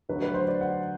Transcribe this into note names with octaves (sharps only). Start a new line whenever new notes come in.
D2 D3 F#3 B4
B4
C5
D5
F#5